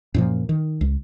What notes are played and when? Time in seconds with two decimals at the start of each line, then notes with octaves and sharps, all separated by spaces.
0.14 F#2 A#2 F3
0.49 D#3
0.81 C#2